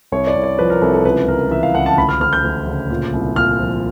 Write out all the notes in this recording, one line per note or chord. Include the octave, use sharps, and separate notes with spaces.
C2 C#5
D5
C2
D5
F3 B4
A#4
C2 A4
A4
C#2 B4
C#2 A#4
E3 E5
F5
C#2 F#5
A5
D2 B5
F6
D2 F6
G6
D2
C#3
A#2
C2
A#2 F6
F3